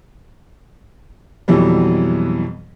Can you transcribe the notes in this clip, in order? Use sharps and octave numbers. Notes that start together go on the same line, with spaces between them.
F2 B2 E3 F#3 G3